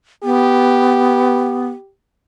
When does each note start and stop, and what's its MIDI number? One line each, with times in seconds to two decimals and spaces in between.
0.24 1.68 59
0.24 1.90 67